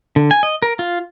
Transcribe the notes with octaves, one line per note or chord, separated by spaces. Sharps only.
D3
G#5
D#5
A#4
F4